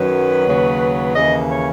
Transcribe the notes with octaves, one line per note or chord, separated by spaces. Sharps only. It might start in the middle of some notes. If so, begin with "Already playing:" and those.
Already playing: F#2 D#3 F#3 B4
D#2 C#3 F#3
D#2 C#3 E3 D#5
C#5